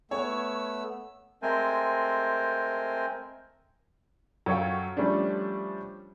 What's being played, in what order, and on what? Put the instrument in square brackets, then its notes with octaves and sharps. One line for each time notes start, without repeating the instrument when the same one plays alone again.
[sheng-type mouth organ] A3 B3 E6 [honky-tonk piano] C#5
[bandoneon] G#3 A3 C4 A#4 C5 G#5
[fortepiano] F#2 A4 C#5 F5 G5
F3 G3 A3 C#4 D4